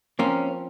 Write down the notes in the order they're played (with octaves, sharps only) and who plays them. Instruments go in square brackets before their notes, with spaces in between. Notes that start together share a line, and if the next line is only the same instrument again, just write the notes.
[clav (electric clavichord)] F3 C4 F4 A#4 [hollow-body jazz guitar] A#3 C#4